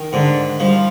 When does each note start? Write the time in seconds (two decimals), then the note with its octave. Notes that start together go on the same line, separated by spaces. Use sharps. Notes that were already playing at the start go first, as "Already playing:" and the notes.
Already playing: D#3
0.13 G#2 D3
0.60 F3 G3